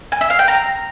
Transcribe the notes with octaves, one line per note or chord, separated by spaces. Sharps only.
G#5
E5
F5
G5
A#5